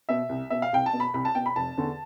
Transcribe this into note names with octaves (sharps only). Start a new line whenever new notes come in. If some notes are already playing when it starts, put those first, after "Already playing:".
B2 E5
C2
B2 E5
F5
C2 G5
A5
B2
B5
C2 B5
A5
B2 G5
B5
F1 A5
E2 D3